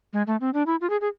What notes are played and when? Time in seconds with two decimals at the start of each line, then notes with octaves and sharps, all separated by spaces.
0.13 G#3
0.27 A3
0.41 C4
0.54 D4
0.67 E4
0.81 F4
0.90 G#4
1.01 G#4